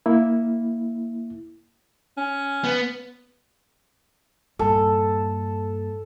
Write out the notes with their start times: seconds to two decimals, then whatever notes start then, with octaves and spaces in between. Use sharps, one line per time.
0.06 A#3 E4
2.17 C#4
2.64 B3
4.59 G2 A#2 A4